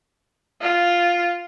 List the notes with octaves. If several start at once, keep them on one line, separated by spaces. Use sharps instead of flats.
F4